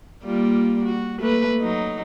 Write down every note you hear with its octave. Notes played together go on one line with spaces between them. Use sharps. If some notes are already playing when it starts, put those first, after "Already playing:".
G3 A#3 F4
F#4
A3 A#3 B4
F#3 D#4